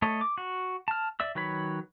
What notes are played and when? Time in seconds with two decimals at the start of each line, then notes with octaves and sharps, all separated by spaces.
0.02 A3 A4 C#5 D#5
0.21 D6
0.38 F#4
0.88 A5 F6
1.20 D5 E5 E6
1.35 D#3 F#3 B4 C#5 B5